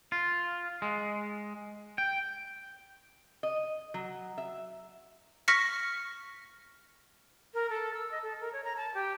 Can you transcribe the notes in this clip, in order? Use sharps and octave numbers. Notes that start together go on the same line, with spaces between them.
F4
G#3
G5
D#5
F#3
E5
C#6 F6 A#6 B6 C#7
A#4
A4
E6
D#5
A4
A#4
C#5
A#5
A5
G4